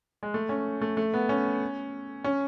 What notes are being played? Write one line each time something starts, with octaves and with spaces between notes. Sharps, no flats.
G#3
A3
C#4
A3
A3
B3
C#4
C#4